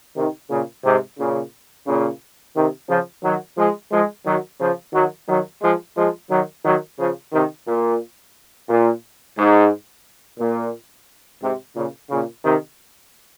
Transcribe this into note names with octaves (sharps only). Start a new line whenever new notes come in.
C3 D#3
A#2 C#3
G#2 C3
A#2 C#3
A#2 C#3
C3 D#3
C#3 F3
D#3 F#3
F3 G#3
F3 G#3
D#3 F#3
C#3 F3
D#3 F#3
D#3 F#3
F3 G#3
F3 G#3
D#3 F#3
D#3 F#3
C#3 F3
C3 D#3
A#2
A#2
G#2
A#2
G#2 C3
A#2 C#3
A#2 C#3
C3 D#3